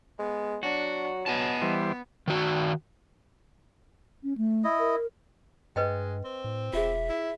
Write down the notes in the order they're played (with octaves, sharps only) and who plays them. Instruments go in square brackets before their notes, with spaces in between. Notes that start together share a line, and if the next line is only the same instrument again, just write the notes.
[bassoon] G#3 [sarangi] B3
[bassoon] F#3 [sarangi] D4 [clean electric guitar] F#4
[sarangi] B3 [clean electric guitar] D#5 G#5 A5
[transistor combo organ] E3 G3 C5
[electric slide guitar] D#3 F#4
[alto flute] C#4
A3
[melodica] E4 D#5
[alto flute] A#4
[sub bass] G2 [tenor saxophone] G#3 [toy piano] B4 D#5 G5
[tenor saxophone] C4
[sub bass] A2
[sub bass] E1 [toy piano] F4 G#4 [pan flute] E5
[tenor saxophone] E4